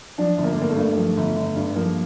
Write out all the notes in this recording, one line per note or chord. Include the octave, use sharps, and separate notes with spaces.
F3 D4
G1
A#3
A3
G1 A#3
A3
G2
F3
G1
G1
G2
F3 A#3